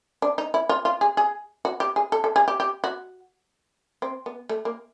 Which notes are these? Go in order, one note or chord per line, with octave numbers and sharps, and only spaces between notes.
D4
D#4
E4
F4
F4
G#4
G#4
F#4
G4
G#4
A4
A4
G#4
G4
G4
F#4
C4
B3
A3
A#3